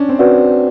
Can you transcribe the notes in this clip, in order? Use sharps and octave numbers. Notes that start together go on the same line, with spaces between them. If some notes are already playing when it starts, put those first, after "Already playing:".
Already playing: C#4 D4
C4
C4 F#4 B4 D5 F#5